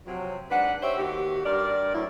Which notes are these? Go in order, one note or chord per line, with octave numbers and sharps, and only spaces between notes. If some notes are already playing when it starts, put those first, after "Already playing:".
C3 F3 F#3
G#2 D4 B4 F#5
G4 C5 C#5 E5
D#2 F#4 G4
G2 A#4 D5
F#2 A2 F#3 A3 E4